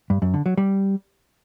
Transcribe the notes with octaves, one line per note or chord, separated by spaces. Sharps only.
G2
F#2
D3
F#3
G3